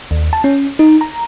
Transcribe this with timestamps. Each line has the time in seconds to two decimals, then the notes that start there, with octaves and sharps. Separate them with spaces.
0.11 D#2
0.33 A5
0.44 C#4
0.79 D#4
1.01 A#5